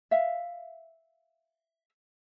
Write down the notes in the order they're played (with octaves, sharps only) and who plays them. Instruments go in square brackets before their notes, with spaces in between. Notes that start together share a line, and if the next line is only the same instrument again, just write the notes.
[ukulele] E5 F5